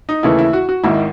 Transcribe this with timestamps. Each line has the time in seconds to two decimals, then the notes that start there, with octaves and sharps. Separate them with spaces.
0.09 D#4
0.23 D#2 C#3 E3 A3 E4
0.39 E4
0.53 F#4
0.69 F#4
0.84 G#1 G#2 D#3 E4